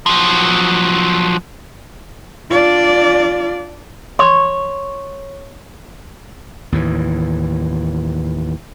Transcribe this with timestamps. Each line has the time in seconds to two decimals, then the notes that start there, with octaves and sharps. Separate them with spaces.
0.06 F3 F#3
2.50 D4 F4 D5
4.19 C#5 C6 C#6
6.72 D#2 A2 E3